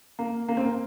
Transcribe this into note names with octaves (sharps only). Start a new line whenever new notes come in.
A#3
A#3
C4
A#3